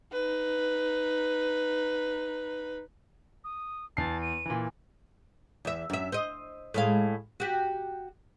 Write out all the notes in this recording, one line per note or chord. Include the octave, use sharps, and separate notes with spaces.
D#4 B4
D#6
E2 A5 C7
D#7
A#2 E3
E2 E5
F#2 E5
C5 D#5
A2 G#3 F5
F#4 G4